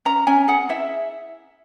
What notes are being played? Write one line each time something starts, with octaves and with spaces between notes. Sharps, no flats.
C#4 A#5
C#4 G#5
G#4 F#5
E4 E5